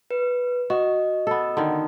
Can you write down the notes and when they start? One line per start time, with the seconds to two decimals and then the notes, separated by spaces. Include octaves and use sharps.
0.11 B4
0.70 F#4 D#5
1.27 B3 A4
1.57 D3 D#3